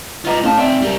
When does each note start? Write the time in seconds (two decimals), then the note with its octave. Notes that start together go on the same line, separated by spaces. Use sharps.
0.25 F4 B4 D#5 A#5 D6
0.43 A2 C#4 F5 A5 F6
0.58 C4 D#4 D5 E5 G5
0.82 G3 A#4